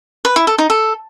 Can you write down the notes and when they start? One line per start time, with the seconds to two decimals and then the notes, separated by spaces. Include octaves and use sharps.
0.25 B4
0.36 E4
0.47 A4
0.58 D#4
0.70 A4